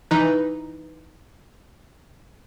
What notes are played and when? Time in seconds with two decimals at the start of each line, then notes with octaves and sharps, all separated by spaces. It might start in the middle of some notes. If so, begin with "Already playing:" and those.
0.11 E3 D#4 B4